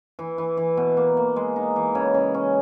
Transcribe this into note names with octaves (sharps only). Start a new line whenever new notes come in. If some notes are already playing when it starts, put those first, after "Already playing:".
E3
E3
E3
B2
A#3
A#3
G#3
D#4
E3
C#3
C#3
C#4